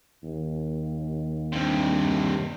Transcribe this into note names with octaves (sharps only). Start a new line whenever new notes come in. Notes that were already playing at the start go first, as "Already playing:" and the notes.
D#2
G2 C3